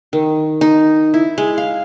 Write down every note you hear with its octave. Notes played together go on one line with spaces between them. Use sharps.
D#3
D#4
E4
G#3
F5